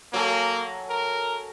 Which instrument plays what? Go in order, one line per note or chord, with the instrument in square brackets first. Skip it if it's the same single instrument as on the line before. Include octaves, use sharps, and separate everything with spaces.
[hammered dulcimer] F#3 A4 G#5 [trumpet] A#3
[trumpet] A#4